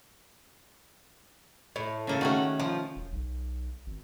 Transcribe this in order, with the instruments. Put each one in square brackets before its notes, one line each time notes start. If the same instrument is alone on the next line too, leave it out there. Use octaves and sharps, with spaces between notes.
[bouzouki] A2
[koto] C#3 A#3 A4
[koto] D#3 A3 C#4 [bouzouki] F#4
[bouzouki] F3
[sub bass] E1
B1
G#1